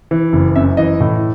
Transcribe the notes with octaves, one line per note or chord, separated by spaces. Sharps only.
E3
F#1
F#2 E5
E3 D#5
A2